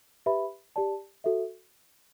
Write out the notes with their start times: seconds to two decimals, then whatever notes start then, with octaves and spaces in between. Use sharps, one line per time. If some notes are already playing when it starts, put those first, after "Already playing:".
0.26 G4 B4 E5 B5
0.76 G4 D5 A5
1.24 F#4 A4 E5